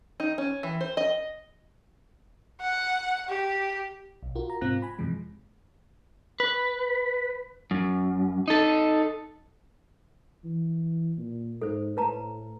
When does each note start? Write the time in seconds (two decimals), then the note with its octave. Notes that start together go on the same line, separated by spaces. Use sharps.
0.20 D#4
0.38 C#4
0.63 E3
0.81 C5
0.97 D#5
2.61 F#5
3.29 G4
4.23 B1
4.35 F4 F#4 A#4
4.50 A#5
4.61 G#2 C3 C4 F4 F#6 A#6
4.82 G#5 B5
4.99 F#2 C3 E3 F3 G#3
6.40 B4
7.71 F#2
8.48 D#4 A4
10.45 E3
11.18 A#2
11.62 G#2 A4 C5
11.97 A2 B4 A5 A#5